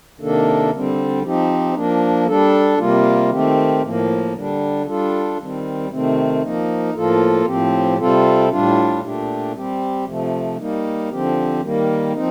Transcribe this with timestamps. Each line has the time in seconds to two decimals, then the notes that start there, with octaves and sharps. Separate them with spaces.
0.19 C3 D#3 A#3 D4 A4
0.71 D3 G3 C4
1.22 F3 C4 D#4 G4
1.74 F3 A#3 D4
2.27 G3 D4 A4
2.78 C3 G3 A#3 F4
3.30 D#3 A3 C4 G4
3.83 A2 F3 A#3
4.34 D3 G3 D4
4.86 G3 D4 F4 A4
5.37 D#3 G3 C4
5.89 C3 D#3 A3 C4
6.42 F3 A#3 D#4
6.94 A2 F3 A#3 F4 A4
7.45 A2 F3 C4 G4
7.97 C3 G3 C4 F4 A4
8.49 A2 G3 D4 F4
9.01 A#2 A3 D4 G4
9.53 G3 C4 G4
10.05 C3 F3 A3
10.57 G3 A#3 D#4
11.10 D3 F3 C4 G4
11.60 D#3 G3 A#3
12.12 F3 C4 D#4